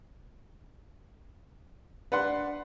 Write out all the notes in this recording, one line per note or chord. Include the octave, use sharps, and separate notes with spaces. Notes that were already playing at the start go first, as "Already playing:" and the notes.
D4 B4 F#5 C6